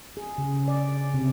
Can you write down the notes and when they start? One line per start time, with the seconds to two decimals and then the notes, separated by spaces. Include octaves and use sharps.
0.17 G#4
0.38 C#3
0.68 D5
1.14 C3